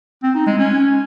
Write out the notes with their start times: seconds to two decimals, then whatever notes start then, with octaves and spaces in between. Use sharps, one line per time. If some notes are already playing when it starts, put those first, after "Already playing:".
0.23 C4
0.35 D#4
0.47 G#3
0.59 C#4